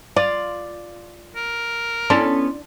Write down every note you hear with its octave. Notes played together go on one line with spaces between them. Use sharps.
F4 D5
A#4
B3 C#4 D4 E4 A4 D5 C6